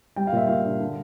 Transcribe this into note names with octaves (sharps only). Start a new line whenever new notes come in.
G3 G5
F5
A#2 E5
A#2 F5
D4
D3